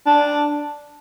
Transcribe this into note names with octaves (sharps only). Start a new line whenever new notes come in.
D4